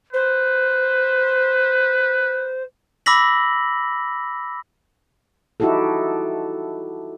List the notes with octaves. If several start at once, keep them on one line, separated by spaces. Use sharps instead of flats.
B4 C5
B5 D6 E6 A#6 B6 F#7
D#4 E4 F#4 G4 A4